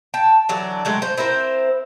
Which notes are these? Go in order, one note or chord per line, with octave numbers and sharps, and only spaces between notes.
G5 A5
D3 E3 F#3 D4
F#3 G#3 A3 G5
C5
C4 E4 A#4 C5